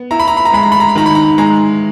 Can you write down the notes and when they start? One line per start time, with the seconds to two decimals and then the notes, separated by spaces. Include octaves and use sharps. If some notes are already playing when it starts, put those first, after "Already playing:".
Already playing: B3
0.11 E4 A#5
0.20 B5
0.28 A#5
0.37 B5
0.45 A#5
0.53 G#3 B5
0.63 A#5
0.72 B5
0.80 A#5
0.89 B5
0.95 D#3 A#5
1.06 B5
1.15 A#5
1.38 G#3 A#5